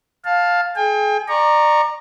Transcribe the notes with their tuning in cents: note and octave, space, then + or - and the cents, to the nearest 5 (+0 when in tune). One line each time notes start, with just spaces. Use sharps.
F5 +15 A5 +0
G#4 +35 G5 +40
D5 +30 A#5 +0 C#6 +0